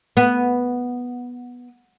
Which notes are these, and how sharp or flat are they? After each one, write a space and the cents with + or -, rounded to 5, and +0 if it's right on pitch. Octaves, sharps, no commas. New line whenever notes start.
B3 -5